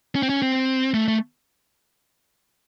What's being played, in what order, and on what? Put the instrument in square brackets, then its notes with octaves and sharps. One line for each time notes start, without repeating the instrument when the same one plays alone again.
[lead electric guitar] C#4
C4
C#4
C4
A3
A3